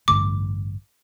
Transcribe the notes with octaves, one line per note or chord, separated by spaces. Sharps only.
A1 G2 D3 A3 D6